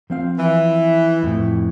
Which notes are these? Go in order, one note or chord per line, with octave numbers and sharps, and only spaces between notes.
F3 C4 F5
E3
F2 A2